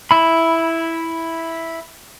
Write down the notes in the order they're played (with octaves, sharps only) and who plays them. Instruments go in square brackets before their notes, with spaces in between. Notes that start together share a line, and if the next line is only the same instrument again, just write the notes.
[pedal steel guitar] E4 B5